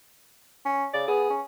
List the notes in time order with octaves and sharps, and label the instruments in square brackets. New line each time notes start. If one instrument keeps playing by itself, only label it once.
[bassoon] C#4
[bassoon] C#3 [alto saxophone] D5
[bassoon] B3 [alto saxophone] G#4
[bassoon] C#4